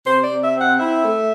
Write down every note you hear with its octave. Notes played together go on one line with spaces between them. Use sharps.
C3 C5
D5
C3
E5
C4
F#5
E4 E5
A3